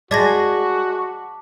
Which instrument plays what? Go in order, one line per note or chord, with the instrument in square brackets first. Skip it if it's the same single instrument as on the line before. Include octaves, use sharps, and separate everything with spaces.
[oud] G#3 [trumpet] F#4 [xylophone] D5 G#6 A#6 [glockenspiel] A5 D6 B6